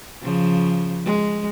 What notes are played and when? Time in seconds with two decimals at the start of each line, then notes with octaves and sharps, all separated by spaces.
0.22 C#3 F3
1.05 G#3